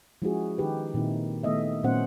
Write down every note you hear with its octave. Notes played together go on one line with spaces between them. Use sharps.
F3 G#3 C#4 E4 F#4 G#4
D#3 D#4 G4 B4
A#2 D#3 C4 D#4 E4
D#3 A3 B3 E4 D#5 E5
A#2 F#3 B3 C#4 C5 F#5